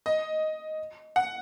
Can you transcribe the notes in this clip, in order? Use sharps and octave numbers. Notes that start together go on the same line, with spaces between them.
D#5
F#5